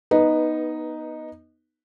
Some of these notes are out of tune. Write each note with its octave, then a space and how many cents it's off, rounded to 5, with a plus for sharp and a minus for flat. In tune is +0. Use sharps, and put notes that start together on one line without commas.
B3 -15 D#4 +0 B4 +0